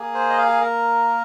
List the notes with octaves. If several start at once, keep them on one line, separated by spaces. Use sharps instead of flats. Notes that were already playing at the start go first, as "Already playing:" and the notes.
Already playing: A#3 G#4
C5
D#5
F5
G#4
A#4